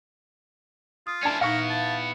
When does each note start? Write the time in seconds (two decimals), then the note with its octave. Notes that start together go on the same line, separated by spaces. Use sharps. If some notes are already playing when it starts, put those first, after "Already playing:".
1.07 F4 D#6
1.23 C#4 D4 E4 A5 G#6
1.41 A#2 B3 D#4 E4 A#4 F5 C#6
1.70 A5